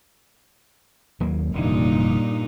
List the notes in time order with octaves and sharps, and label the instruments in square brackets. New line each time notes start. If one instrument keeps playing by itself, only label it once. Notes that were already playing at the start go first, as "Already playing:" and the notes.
[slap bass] D#2 F#3 A#3
[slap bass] F1 D3 E3 [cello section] G2 A#2 D#4